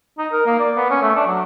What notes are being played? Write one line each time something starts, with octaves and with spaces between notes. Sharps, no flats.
D#4
A#4
A#3
D5
B3
C#4
A3
D4
F#3